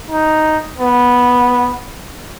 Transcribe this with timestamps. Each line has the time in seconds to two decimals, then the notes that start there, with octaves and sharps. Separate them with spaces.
0.10 D#4
0.78 B3